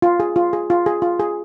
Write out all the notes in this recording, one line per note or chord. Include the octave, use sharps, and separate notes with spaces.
F4
G#4
F4
G#4
F4
G#4
F4
G#4